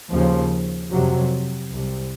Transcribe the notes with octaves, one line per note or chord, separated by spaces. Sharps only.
D#2 C#3 F3
F2 C3 F#3
C2 C3